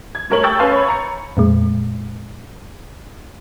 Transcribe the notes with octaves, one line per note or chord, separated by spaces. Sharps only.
G#6
G3 A3 A#4 C#5 F#7
G5 C#6 E6 G6 A6
C#4 B4 F5 G#5 A5 C6
C#5 B5
A#5 C#7
F2 A#2 G#3